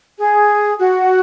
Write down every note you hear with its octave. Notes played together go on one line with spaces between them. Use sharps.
G#4
F#4